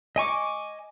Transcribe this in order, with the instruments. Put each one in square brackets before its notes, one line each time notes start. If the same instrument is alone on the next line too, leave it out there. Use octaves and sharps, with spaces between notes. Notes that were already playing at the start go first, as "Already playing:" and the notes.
[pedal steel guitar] D#5 G#5 C#6 D6